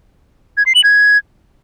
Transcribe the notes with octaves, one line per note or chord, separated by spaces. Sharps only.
G#6
C7
F#7
G#6